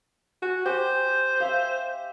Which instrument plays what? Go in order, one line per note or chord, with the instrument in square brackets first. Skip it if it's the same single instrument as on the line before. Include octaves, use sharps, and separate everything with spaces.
[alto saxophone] F#4 [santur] G#5
[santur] G4 G#5 [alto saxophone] C5
[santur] E5 F5